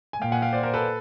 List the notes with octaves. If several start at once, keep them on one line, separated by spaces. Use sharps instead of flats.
G#5
A#2 F5 G5
F#5 G#5
F5 G5
C5 D5
A#4 C5
A4 B4